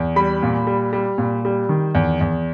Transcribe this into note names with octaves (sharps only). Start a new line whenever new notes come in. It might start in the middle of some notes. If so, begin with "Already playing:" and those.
Already playing: E2
G3 B5
A#2
G3
G3
A#2
G3
D#3
E2
E2